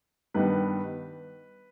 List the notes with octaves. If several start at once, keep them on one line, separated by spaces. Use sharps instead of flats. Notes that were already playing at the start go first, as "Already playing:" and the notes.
G2 D#3 G3 B3 B4